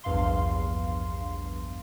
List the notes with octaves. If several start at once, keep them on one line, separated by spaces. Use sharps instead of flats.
A#1 E2 G2 F5 C6